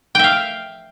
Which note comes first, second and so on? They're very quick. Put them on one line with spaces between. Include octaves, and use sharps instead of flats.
G5 E5 F5